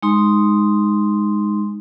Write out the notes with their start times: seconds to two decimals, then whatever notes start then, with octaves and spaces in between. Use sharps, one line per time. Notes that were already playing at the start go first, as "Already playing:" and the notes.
0.03 G#3 D#4 C6